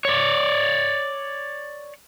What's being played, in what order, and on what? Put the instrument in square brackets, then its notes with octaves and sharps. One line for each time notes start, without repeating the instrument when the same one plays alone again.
[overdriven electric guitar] C#5 D5